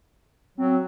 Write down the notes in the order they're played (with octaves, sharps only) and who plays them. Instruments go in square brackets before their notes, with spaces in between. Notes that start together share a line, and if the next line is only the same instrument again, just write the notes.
[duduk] F#3 [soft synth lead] C4